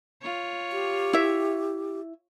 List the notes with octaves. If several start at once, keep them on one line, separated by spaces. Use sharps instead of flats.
F4 C#5
G4
E4 E5